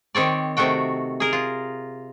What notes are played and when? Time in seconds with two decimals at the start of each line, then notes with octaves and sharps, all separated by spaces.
0.15 D#3 C4 C#5 D5
0.57 C3 D#3 A3 F#4 G5
1.20 G#4 A#4
1.33 F4